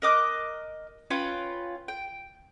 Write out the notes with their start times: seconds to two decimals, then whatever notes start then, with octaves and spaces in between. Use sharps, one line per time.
0.02 A#4 D#5 D6 F#6
1.10 C#4 F4 B4 G5
1.88 G5